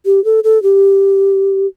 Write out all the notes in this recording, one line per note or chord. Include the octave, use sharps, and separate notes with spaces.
G4
A4
A4
G4